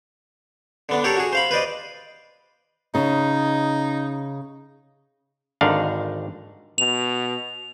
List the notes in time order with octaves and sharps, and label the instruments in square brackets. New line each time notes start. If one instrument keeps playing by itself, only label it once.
[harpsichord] D3 B3 D4
D4 G4 A4 A#4 C#5 D5
F#4 G#4
C5 F5 B5
B4 C5 D5 D#5
[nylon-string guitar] C#3 [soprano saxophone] D#4
[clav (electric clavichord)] G#1 D3 D4 D#4 F5
[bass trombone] B2 [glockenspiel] F7